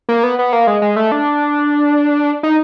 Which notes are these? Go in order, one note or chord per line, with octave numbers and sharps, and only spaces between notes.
A#3
B3
B3
A#3
G#3
G#3
A3
D4
D#4